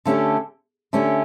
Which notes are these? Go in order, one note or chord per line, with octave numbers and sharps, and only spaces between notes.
D3 A3 C#4 G4
D3 A3 C#4 G4